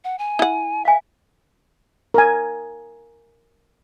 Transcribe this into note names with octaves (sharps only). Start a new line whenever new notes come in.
F#5
G#5
E4 F#5
E5 F5 G#5
A#4 G#5